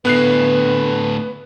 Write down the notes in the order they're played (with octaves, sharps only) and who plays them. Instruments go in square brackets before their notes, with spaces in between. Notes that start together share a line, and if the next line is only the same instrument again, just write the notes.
[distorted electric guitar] D2 A2 [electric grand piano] B3 F#6 C7 [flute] B4